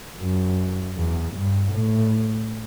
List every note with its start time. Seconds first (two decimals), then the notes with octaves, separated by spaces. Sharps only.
0.19 F#2
0.96 E2
1.34 G2
1.72 A2